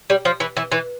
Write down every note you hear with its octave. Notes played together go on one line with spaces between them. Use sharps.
G3
F3
E3
E3
E3